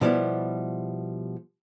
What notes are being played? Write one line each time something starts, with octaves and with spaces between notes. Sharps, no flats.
B2 F3 G3 B3 E4